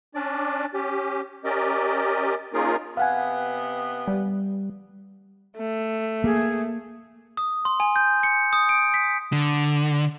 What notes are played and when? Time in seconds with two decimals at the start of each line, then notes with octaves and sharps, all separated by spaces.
0.15 C#4 D4 D5
0.74 C#4 G4
1.44 C#4 G4 A#4 D5 D#5
2.54 A#3 C#4 D#4 F4 G#4 A#4
2.97 C3 B3 F5 F#5 G#5
4.08 G3
5.58 A3
6.24 A#3 G#4
7.37 D#6
7.65 C6
7.80 G#5
7.96 G6
8.23 C#7
8.53 D#6
8.69 D7
8.94 B6
9.33 D3